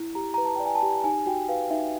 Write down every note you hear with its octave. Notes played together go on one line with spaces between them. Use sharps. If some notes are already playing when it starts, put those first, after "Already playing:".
Already playing: E4
G4 A#5
B4 A#5
A5
D5 G5
G#5
A5
G4
D#4 G#5
F#4 G5
B4 F5
D#4 E5